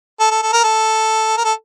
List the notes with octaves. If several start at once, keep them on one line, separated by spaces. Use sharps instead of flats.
A4
A4
A4
A#4
A4
A#4
A4